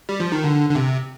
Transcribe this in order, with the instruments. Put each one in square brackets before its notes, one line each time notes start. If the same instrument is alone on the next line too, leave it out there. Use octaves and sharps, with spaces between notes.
[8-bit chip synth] G3
F3
D#3
D3
D3
C3